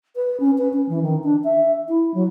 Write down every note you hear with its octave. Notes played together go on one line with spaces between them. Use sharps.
B4
C#4
B4
C#4
E3
D#3
D4
E5
E4
F#3